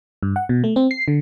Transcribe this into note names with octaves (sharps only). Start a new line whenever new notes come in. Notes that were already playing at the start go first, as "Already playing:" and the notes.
G2
F#5
B2
A3
C4
C7
D3